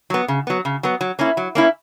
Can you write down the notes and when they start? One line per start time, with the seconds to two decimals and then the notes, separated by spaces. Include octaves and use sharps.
0.10 F#3 B3
0.28 C#3
0.47 F#3 B3
0.65 C#3
0.83 F#3 B3
1.01 F#3
1.19 A#3 C#4 E4
1.37 F#3
1.55 A#3 C#4 E4